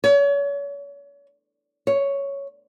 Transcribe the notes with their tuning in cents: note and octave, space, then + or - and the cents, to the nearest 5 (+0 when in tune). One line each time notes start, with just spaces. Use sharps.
C#5 +35
C#5 +5